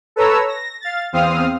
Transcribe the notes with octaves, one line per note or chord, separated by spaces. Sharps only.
A4 B4 C#5 A#5 E6
A#6
F5 A6
E2 C4 F5 D#6 F6